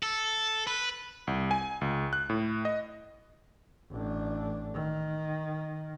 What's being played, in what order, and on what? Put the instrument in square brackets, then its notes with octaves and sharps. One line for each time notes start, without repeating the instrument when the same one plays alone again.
[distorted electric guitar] A4
B4
[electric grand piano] C2
G#5
C#2
F#6
A2
D#5
[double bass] A1 D4
D#3